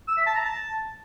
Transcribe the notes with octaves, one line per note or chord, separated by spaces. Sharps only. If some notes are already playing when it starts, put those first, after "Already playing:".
E6
E5
A5
A#5
A5